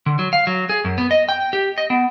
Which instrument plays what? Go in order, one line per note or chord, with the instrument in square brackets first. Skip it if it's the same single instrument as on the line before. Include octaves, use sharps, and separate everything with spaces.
[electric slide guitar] D3
F#3
F5
F#3
G#4
F#2
B3
D#5
G5
G4
D#5
B3